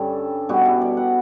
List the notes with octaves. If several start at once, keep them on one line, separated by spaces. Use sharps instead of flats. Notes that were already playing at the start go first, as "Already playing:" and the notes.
Already playing: G2 D3 G3 C#4 A4
B2 G3 B3 F#4
E4
D5
F#5